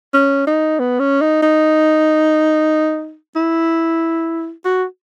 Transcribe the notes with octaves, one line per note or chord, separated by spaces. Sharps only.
C#4
D#4
B3
C#4
D#4
D#4
E4
F#4